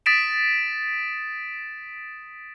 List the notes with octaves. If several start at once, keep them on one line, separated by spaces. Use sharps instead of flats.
D#6 A6 B6 D7 E7